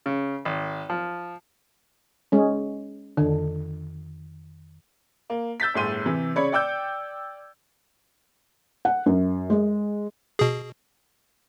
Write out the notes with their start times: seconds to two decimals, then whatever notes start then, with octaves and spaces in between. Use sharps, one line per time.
0.06 C#3
0.45 G#1
0.90 F3
2.32 G#3 C#4
3.17 F2 D3 D#3
5.30 A#3
5.60 E6 G6 A6 B6
5.74 G1 A2 G#4 C6 D#7
6.06 C3 E3
6.35 C#3 C#5 D5 B5 G#6 C#7
6.52 D5 G5 D6 E6 G6
8.85 F#5
9.06 F#2
9.50 G#3
10.39 B2 G#4